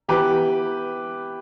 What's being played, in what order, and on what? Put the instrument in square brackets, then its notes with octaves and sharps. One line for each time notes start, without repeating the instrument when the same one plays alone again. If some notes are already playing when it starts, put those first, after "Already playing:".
[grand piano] E3 B3 G4 B4